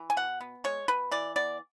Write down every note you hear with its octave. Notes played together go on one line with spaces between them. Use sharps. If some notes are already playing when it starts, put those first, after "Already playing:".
Already playing: E3
G#5
B2 F#5
B3
G#3 C#5
B2 B4
E3 D5
B3 D5